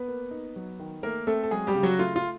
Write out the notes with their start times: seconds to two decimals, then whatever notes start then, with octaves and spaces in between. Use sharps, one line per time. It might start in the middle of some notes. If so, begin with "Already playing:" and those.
Already playing: B3 B4
0.08 A#3
0.31 D#4
0.56 F#3
0.79 D#3
1.03 A3 A#3 A#4
1.27 A3 C4 A4
1.44 A4
1.51 F#3 G#3 G#4
1.67 G3 G4
1.75 C#3
1.83 F#3 F#4
1.99 A3 F4
2.16 F4